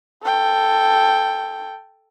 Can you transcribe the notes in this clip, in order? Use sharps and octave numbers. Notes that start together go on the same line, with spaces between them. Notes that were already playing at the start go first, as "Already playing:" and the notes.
A4 G5